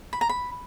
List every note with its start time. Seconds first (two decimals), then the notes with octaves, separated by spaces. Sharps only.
0.13 B5
0.21 A#5
0.29 B5